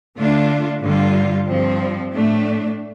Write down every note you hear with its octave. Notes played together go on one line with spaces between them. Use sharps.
D3 A3 D4 F4
G2 D3 G3 F4
G2 F3 C4
A2 A3 D4